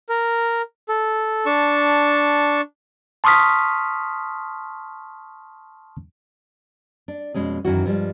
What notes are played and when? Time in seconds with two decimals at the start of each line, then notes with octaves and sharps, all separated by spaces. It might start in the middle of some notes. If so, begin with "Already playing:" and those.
0.09 A#4
0.89 A4
1.46 D4 A5 C#6
3.24 A5 C6 C#6 D#6 F6 B6
7.08 D4
7.34 F2 B2 G#3 C#4 G#4
7.65 F#2 D#3 E3 C#4 E4 F#4
7.86 G2 F3 G3 G#3